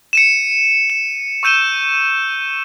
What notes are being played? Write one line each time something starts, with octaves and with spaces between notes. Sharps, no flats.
C#7 D#7 E7
E7
C#6 E6 G6 D#7 E7 G7